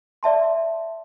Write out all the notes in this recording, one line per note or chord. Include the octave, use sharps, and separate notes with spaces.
D5 E5 A5 C6